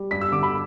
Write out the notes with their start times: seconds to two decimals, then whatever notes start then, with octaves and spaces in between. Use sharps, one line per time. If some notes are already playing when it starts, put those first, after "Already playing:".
Already playing: G3
0.11 G2 B6
0.21 E6
0.32 D3 D6
0.43 B5